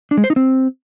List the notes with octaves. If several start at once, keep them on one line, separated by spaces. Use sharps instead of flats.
D4
G#3
C5
D#4
C4